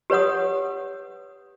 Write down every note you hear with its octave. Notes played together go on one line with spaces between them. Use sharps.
G4 B4 C#5 F#5 D#6